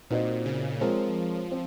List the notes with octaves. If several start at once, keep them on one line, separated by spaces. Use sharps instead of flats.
A#2 C4 D#4 F#4 C5 D#5
C#3
F3 G#3 C4 F4 A#4 C#5
C4